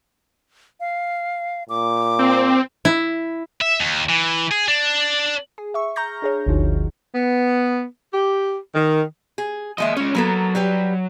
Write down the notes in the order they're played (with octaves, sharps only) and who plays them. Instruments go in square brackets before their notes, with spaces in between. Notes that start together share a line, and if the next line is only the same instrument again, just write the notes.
[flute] F5
[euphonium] A#2 [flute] D6
[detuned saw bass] C4
[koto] E4
[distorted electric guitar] E5
D#2
E3
G#4
D4
[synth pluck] G#4
E5 C#6
A#5 C#6 F6 G6 A#6
D4 G#4 C#5
G1 D2 D3 F3 D#4 F#4
[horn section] B3
G4
D#3
[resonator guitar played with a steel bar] G#4
[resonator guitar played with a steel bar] F3 G#3 E5 [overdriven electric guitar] A#3 D#5
[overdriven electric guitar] G#3 C#4 [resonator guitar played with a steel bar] C#5
[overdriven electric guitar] F#3 [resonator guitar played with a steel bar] A#3 B3 A4
[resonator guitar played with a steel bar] G3 G4 B4